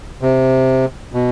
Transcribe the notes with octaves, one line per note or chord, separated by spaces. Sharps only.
C3
B2